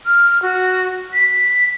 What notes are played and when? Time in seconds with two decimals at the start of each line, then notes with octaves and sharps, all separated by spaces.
0.06 F6
0.42 F#4
1.14 B6